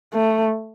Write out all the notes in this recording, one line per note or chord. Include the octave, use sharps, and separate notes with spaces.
A3